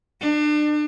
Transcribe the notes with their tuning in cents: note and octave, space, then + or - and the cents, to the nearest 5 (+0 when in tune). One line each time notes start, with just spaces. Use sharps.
D4 +35